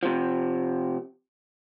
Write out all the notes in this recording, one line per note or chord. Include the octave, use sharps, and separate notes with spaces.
C3 F3